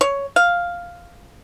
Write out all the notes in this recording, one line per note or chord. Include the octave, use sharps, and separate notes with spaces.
C#5
F5